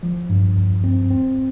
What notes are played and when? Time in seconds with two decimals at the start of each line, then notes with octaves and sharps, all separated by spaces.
0.03 F3
0.30 G2
0.57 D#2
0.84 C4
1.11 C4